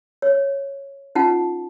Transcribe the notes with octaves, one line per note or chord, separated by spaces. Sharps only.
C#5
C#4 D#4 F4 F#5 A5